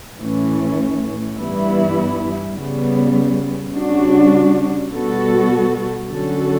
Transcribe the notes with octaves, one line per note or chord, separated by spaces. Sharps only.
A2 E3 A3 C#4
G2 E3 G3 B3 E4
C#3 G3 B3
C#3 G3 D4 F#4
B2 G3 B3 F#4 A4
D3 F#3 C#4 F#4 A4